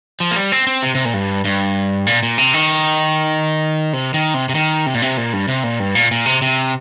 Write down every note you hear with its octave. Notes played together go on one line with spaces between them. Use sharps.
F3
A#3
G3
C4
C4
C3
C3
A#2
G2
G2
A#2
A#2
C3
D#3
C3
D#3
C3
C3
D#3
C3
A#2
C3
A#2
G2
C3
A#2
G2
A#2
A#2
C3
C3